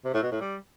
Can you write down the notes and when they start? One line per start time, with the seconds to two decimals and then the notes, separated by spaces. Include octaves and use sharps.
0.05 C3
0.14 A2
0.23 B2
0.32 A2
0.41 G3